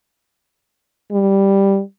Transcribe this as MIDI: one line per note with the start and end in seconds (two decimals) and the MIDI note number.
1.12 1.81 55